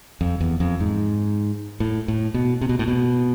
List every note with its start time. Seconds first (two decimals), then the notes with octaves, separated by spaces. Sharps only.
0.21 F2
0.41 E2
0.60 F2
0.80 G#2
1.80 A2
2.08 A2
2.34 B2
2.61 C3
2.69 B2
2.79 A2
2.88 B2